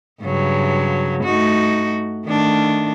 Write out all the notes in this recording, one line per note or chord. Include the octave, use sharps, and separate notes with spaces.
G2 C#3 F#3
A3 D#4 F#4
D#3 A3 D4